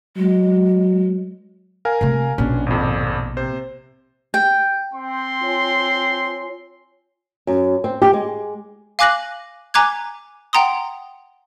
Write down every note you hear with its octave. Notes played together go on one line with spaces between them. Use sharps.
F#3 G#3
A#4 F5 G#5
C3 A3
A#1 B2 C#4 D4
G#1 F2
C3 C5
G5
C4 C6
F4 C#5 G#5
F#2
C4
G4
G#3
F5 G#5 D6 F#6 A#6 F#7
G#5 A#5 D6 F#6 G#6
F#5 G5 A#5 C6 D#6